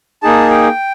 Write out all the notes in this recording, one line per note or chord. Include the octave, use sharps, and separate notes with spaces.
A#3 D#4 G#4 A5
G5